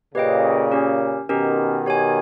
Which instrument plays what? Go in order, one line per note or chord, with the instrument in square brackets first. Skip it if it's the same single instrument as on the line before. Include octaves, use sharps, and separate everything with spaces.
[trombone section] A#2 C#3 [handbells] G4 B4 D#5 G5
[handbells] C#4 G4 A#4
[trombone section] B2 D#3 [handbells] C#4 G4 A#4
[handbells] G4 C#5 G#5